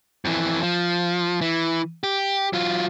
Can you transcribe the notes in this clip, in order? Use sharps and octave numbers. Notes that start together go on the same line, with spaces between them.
F2 E3
F3
E3
G4
F#3 F4